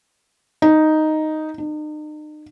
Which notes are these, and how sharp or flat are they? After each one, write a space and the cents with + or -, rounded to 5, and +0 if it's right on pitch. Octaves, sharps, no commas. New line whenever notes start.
D#4 +0
D#4 -40